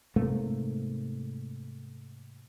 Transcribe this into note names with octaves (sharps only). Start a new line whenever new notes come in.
G#2 C3 A3 A#3